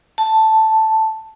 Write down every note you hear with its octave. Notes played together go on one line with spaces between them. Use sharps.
A5